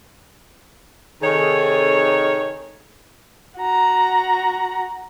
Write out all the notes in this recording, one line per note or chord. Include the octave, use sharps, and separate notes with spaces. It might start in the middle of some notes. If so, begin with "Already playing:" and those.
C3 D#3 G#4 A4 C#5
F#4 A#5